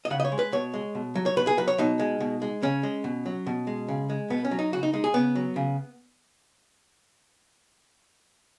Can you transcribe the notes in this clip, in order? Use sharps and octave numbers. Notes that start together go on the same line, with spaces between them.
D#5
C#3 F#5
D#5
C#5
G#3
B4
B2 C#5
G#3
B2
F#3
C#5
B2 B4
G#4
F#3 B4
C#5
B2 D#4
G#3
B2
G#3
C#3 C#4
G#3
B2
F#3
B2
G#3
C#3
G#3
B2 B3
C#4
F#3
D#4
C#3 F#4
D#4
G#3 D#4
G#4
C#3 B3
F#3
C#3